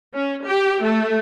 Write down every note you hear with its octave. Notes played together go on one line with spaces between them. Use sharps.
C#4
G4
A3